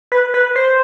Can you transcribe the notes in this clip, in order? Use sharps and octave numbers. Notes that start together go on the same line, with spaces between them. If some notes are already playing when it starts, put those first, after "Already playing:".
B4
B4
C5